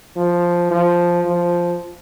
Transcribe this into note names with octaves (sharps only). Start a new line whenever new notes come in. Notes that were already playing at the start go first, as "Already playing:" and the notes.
F3
F3
F3